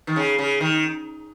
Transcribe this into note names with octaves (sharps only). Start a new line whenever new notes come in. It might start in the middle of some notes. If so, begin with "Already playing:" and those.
D#3
C#3
C#3
D#3